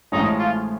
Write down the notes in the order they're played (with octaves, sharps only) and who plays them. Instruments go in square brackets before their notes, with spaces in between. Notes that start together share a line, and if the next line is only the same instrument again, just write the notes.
[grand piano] A1 A2 F3 G#3 C#4 [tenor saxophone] D#4
[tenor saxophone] F4